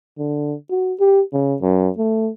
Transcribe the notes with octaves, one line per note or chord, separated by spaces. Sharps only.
D3
F#4
G4
C#3
F#2
A3